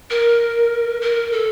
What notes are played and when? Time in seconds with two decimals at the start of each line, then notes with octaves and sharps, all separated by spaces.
0.10 A#4
1.02 A#4
1.32 A4